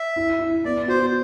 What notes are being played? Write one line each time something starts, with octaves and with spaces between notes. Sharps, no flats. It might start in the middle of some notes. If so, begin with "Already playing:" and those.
Already playing: E5
E4
E4
B3 D5
F#4 C5